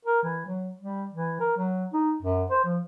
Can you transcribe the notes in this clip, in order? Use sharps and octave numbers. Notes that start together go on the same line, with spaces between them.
A#4
E3
F#3
G3
E3
A#4
F#3
D#4
F#2
C5
F3